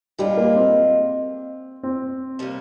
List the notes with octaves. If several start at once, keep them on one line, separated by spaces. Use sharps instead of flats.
A#2 G3 G#3 D4 F4
A#3
C4
C4
C3 G3 A#3